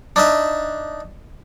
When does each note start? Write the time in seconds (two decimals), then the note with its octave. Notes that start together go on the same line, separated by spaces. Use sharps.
0.16 D4 D#4 E5